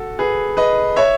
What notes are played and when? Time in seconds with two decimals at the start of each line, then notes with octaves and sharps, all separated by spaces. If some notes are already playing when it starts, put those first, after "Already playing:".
Already playing: F#4 A4
0.19 G#4 B4
0.57 B4 D#5
0.96 C#5 E5